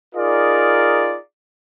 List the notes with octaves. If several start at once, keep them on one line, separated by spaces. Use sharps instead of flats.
D#4 F4 G#4 A#4 D5